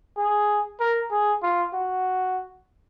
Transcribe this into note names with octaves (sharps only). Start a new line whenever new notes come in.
G#4
A#4
G#4
F4
F#4